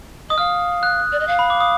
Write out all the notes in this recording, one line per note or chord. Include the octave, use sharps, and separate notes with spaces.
D#5 D#6
F5 F6
F#6
D5
D#5
F5
B5
D6
D#6